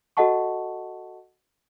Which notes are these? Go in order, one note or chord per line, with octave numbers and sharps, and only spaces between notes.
F#4 A4 D#5 F#5 A5 C#6